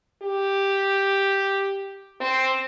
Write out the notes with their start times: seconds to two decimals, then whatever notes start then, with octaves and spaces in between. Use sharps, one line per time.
0.23 G4
2.20 C4